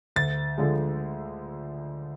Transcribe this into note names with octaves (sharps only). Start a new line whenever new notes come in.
D2 A6
D3 F3 G#3